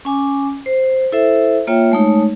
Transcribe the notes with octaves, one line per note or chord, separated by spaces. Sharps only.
C#4 G#5 D6
C5
E4 A4 C5 E5
A#3 F4 C#5 E5 G5
G#3 A3 D#4 C#5